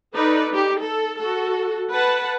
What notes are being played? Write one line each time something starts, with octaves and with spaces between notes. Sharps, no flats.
D#4 A4 B4 D5
D#4 G4
A4
F#4 A4
B4 F#5 A5